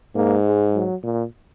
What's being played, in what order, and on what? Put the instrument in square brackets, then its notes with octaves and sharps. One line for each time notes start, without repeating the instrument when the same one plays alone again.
[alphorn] G#2 [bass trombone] A#3
[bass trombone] G#3
F#3
A#2